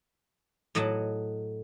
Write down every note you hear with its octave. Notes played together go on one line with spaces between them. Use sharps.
A2 F#3 D#5 F#5 A5